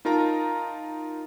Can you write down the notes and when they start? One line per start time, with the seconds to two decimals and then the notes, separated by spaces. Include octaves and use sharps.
0.05 D#4 F4 A#4 A5 A#5